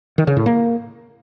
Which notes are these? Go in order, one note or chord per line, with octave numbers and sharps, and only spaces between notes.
D#3
C#3
A2
A#3